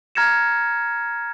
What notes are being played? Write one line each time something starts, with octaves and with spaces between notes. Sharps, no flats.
A#5 F6 G#6 A#6 C#7 E7